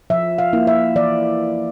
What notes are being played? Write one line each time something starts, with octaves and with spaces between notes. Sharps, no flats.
F3 E5
F5
A#3 E4
E5
E3 D5